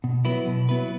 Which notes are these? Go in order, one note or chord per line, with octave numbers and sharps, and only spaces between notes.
B2
F#3 B3 E4 B4
B2
F#3 B3 E4 B4